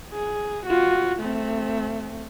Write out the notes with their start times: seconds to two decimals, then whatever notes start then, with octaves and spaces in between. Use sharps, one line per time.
0.13 G#4
0.66 F4 F#4
1.19 A3 C4